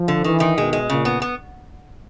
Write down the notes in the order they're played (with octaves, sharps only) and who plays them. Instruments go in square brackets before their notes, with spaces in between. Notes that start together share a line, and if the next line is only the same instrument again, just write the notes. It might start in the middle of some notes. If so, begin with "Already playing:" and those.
Already playing: [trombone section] F3
[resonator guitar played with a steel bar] D3
[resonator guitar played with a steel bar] D#3 [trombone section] E3
[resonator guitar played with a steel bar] D#3
[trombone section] B2 [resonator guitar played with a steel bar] G#3
[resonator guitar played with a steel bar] G#3
[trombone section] A#2 [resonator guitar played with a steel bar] C#3
[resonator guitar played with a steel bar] B3
B3